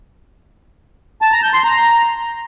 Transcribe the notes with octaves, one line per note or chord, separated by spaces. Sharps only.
A5
A#5
G6
C6
A#5